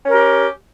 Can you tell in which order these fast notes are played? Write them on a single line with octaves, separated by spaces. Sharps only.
C#4 A#4 G4